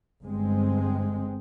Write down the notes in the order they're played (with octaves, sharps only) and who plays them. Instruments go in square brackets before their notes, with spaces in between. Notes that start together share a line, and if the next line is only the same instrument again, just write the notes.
[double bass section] G1 G#3 C4